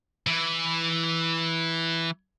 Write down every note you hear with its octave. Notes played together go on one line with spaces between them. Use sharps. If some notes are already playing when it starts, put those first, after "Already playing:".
E3